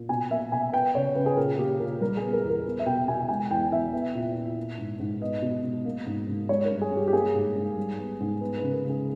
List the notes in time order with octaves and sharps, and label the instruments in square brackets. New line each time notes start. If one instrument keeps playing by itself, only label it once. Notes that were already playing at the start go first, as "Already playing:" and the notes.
Already playing: [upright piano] A#2
B2 G#5
A#3 E5
B2 G#5
B3 G5
C#3 C#5
C#3 B4
G#4
A#2 A#4
A#3 G4
A#2 A#4
G3 A#4
B3 G#4
A#4
E2
A#4
B3
E5
B2 G5
B2 G#5
G#3 G#5
E2 G5
E2 E5
B3
A#2
A#2
A#3
G#2
G#2
B3 D#5
B2
B2
A#3
G#2
G#2
G#3 C#5
A#4
G2
G#4
G2
G4
G4
A#3 G#4
G#2
G#2
G3
B3
G#2
B3 B4
C#3 B4
A#4
C#3 G#4